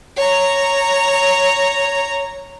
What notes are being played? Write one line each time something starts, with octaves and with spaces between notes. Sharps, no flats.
C#5 A#5